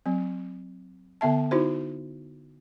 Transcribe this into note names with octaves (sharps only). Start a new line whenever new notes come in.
F#3 C4
D3 B3 E5 A5
D#4 E4 F#4 C5